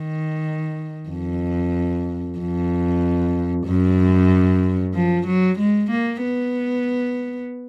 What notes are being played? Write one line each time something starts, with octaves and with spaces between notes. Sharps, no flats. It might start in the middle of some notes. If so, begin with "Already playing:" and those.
Already playing: D#3
F2
F2
F#2
F3
F#3
G#3
A#3
B3